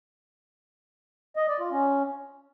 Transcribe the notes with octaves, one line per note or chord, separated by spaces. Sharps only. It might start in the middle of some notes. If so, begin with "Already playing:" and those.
D#5
D5
F4
C#4